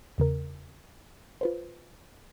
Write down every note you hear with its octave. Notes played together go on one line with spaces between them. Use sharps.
E2 C#3 A#4
F4 B4 C5